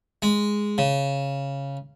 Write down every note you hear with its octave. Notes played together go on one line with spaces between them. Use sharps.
G#3
C#3